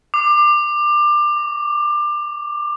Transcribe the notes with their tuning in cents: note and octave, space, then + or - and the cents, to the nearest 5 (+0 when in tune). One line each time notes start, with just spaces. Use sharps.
D6 +25
D6 -35